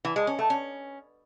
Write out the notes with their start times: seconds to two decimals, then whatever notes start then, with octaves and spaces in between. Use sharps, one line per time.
0.05 E3
0.16 G#3
0.27 C#4
0.39 A3
0.50 C#4